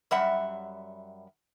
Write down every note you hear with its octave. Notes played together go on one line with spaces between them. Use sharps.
F#2 G3 E5 F#5